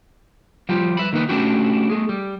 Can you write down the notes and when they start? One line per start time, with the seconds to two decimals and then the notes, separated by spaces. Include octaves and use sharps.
0.69 F3 G3 F4 G4
0.97 B4 E5 B5
1.13 D#3 A#3 D#4 B4
1.29 A3 C#4 D4 E4 F#4 G4
1.90 A3 G#4
2.09 G3